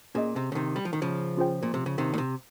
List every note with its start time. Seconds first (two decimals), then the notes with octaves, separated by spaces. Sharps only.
0.15 A#2 C#4 G#4 D#5
0.36 C3
0.52 C#3
0.55 C3 D#3
0.76 G3
0.85 F3
0.93 D#3
1.02 C#3 F3
1.37 C#4 F4 G#4 C5 G5
1.63 A#2
1.74 C3
1.86 C#3
1.98 C3 D#3
2.14 A#2
2.18 C3